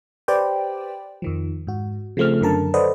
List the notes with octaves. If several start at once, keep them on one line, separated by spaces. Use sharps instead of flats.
G4 B4 C5 D5 G5
F2 D#3 F3
G#2 F#4
C#3 F3 A3 C4 F6
F#2 D3 A#4 A5
A4 B4 C5 D5 D#5 F#5